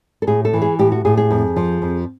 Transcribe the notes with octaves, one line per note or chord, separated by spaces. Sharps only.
A4
A2 G#4
A4
E3
G#4
A2 G4
F#4
A2 G#4
G#4
F2
F3
F2